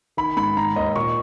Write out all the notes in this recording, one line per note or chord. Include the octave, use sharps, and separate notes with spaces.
D#3 B5
G#2 B5
D#3 A#5
D#2 D#5
A#2 C#6